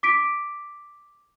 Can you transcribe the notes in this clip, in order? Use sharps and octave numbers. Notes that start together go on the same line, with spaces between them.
D6 B6 D7